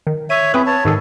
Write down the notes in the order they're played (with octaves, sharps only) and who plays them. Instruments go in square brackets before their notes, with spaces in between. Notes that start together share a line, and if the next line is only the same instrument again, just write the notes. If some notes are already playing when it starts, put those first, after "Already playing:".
[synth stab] D#3
[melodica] C#5 E5 [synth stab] D#7
[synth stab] C4 B4 [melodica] E4 G#4
[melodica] C#5 A5
[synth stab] G#2 D#3 G#4 [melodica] A4